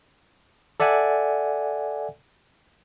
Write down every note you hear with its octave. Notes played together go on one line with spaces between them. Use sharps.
A4 D5 E5 F#5 G#5